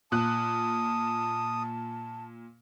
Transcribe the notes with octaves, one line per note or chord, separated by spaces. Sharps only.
A#2 A5 D#6 F#6